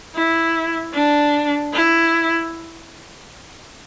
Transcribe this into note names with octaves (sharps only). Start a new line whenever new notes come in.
E4
D4
E4